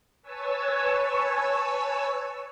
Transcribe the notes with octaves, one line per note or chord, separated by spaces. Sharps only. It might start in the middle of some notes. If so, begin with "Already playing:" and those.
B4 C#5 G#5 A5 E6